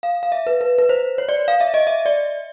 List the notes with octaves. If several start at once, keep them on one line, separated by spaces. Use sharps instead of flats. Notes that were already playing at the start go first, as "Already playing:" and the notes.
F5
F5
E5
B4
B4
B4
C5
C#5
D5
F5
E5
D#5
E5
D5